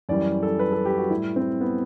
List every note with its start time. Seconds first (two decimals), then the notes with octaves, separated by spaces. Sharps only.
0.09 F#2 E3 G3 D5
0.43 A4
0.59 B4
0.72 A4
0.85 G4
0.98 F#4
1.10 A2 G3 E4
1.36 C4
1.61 B3